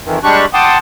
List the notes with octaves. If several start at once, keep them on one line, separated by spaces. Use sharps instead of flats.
F2 D#3 E3
G3 G#3 D4 G4 C#6 F#6
F#5 G5 A5 C6 D6 D#6